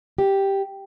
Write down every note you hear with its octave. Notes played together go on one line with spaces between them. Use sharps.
G4